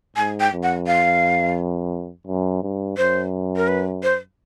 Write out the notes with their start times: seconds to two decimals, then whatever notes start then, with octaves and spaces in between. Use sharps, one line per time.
0.16 G#2 G#5
0.40 G5
0.52 F2
0.63 F#5
0.87 F5
2.27 F#2
2.63 G2
2.97 F#2 C5
3.57 A#4
3.68 B4
4.03 C5